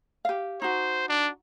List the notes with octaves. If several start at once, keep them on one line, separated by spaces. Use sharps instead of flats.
G4 F5
D#4 F#4 C5
D4